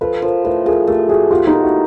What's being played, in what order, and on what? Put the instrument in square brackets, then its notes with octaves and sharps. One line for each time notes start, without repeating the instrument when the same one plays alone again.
[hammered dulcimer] F3 [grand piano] A4 B4
[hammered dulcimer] F3 [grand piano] A#4 C5
[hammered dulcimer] A2 [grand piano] A4 B4
[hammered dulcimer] F3 [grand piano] G#4 A#4
[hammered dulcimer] A3 [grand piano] G4 A4
[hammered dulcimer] A2 [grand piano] F#4 G#4
[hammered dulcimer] B3 [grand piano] F4 G4
[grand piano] D#4 F4
[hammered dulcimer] D#3
[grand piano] E4 F#4